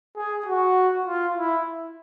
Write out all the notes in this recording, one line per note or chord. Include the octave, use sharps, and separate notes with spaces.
G#4
F#4
F4
E4